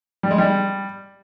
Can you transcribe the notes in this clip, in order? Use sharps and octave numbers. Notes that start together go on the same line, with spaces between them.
G3
G#3
G3